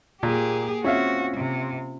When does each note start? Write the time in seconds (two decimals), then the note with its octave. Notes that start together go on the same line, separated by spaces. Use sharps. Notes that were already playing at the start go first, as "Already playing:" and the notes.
0.23 A#2 A#3 G4 G#4
0.85 C4 C#4 F4 F#4 C#5 E5 F5
1.36 C3